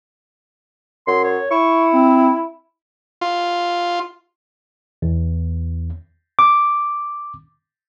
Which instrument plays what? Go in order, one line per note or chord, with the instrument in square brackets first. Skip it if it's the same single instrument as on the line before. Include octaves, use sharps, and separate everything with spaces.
[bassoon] F#2 [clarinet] C6
[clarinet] C#5
[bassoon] E4 [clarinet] C#6
[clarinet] C4
[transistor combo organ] F4
[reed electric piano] E2
D6